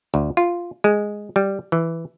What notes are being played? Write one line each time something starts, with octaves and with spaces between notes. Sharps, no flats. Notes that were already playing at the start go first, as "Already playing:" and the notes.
D2
F4
G#3
G3
E3